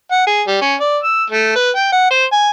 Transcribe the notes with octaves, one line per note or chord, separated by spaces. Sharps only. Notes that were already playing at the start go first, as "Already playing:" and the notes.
F#5
G#4
G3
C#4
D5
E6
A3
B4
G5
F#5
C5
G#5